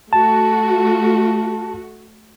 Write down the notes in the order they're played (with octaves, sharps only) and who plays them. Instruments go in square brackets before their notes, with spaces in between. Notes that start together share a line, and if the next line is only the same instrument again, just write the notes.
[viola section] A3 F#4 [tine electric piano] A5